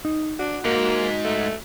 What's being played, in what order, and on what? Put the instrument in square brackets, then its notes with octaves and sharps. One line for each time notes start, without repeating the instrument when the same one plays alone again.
[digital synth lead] D#4
[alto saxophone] D4 [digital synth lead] F#4
[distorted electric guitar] G#2 [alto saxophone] A#3
[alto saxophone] A3